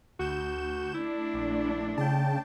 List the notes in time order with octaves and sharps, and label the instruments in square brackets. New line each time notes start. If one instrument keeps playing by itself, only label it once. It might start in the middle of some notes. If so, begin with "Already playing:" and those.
[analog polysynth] D2 G6 E7 [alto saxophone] F#4
[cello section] A3 D4 [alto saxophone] E4
[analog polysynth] A#1
[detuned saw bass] C#3 [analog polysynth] G5 A5